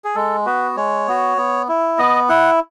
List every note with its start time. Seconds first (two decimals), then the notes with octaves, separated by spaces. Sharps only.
0.05 G#4
0.15 G#3 A4
0.46 B3 F#4 B4
0.77 G#3 C#5
1.07 B3 F#4
1.37 B3
1.69 E4
1.98 B3 D#5
2.29 E4 F#5